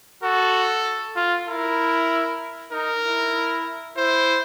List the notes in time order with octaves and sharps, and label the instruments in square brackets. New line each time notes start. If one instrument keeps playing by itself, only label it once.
[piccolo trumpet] F#4 [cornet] A4
[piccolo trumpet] F4
[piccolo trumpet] E4 [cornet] A#4
[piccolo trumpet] D#4 [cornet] A#4
[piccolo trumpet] E4
[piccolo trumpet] E4 [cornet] C5